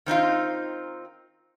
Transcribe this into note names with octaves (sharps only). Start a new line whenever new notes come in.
D#3 C4 D#4 F4